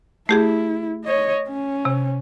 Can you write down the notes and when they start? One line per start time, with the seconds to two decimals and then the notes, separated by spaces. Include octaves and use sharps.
0.29 A3 E4 G4 G#4
1.05 C#5 D#5
1.48 C#4
1.85 C3